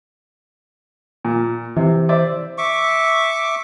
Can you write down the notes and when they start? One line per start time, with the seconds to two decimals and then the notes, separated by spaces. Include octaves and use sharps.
1.25 A#2
1.76 C3 E3
2.09 C5 D5 E5
2.58 E5 C#6 D6